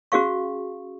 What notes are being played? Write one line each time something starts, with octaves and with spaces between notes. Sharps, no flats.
C#4 F#4 G#4 F5 C#6